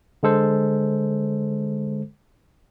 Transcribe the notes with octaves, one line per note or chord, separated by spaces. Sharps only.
D3 G#3 A4 C5